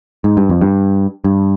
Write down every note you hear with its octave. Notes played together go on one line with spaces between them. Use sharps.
G#2
G2
F2
G2
G2